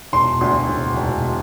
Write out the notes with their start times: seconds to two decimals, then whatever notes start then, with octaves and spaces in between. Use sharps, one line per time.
0.13 E1 C6
0.41 D2
0.68 E1
0.96 E1